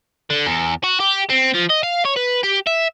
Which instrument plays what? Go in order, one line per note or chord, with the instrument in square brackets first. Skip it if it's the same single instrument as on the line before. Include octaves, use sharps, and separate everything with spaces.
[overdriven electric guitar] D3
E2
F#4
G4
C4
F3
D#5
F5
C#5
B4
G4
E5